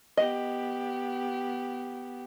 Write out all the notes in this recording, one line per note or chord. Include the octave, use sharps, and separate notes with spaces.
B3 G4 D#5